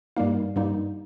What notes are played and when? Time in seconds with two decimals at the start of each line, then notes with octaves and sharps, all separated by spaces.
0.16 G2 G3 A#3 D#4 F5
0.56 G2 G3 A#3 D#4